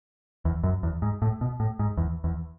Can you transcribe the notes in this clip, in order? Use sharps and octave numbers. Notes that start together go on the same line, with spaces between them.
E2
F#2
E2
G#2
A2
B2
A2
G#2
E2
E2